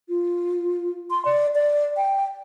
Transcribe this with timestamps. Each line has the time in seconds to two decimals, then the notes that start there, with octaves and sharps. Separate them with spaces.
0.09 F4
1.10 C6
1.25 D5
1.55 D5
1.97 G5